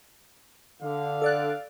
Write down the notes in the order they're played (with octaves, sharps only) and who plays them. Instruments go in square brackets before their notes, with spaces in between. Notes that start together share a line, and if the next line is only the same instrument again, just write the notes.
[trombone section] D3 [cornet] F5
[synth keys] A4 D5 F#6